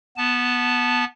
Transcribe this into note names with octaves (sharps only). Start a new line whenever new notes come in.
B3 A5